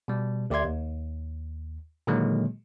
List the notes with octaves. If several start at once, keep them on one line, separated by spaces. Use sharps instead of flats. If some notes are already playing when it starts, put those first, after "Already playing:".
B2 G3
D2 G4 D5 E5 C6 G#6
D#2
A#2 D3 D#3 F#3 G#3 A#3